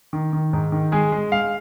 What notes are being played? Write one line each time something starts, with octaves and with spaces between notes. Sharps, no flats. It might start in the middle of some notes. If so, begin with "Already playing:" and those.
D#3
D#3
G#2
D#3
G#3 G#4
G#3
G#3 F5